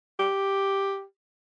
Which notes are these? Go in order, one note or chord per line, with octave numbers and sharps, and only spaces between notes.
G4